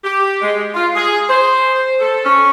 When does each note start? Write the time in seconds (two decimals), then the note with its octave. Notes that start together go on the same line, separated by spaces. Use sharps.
0.04 G4
0.42 G#3
0.74 F4
0.96 G#4
1.29 C5
2.00 A4
2.25 C#4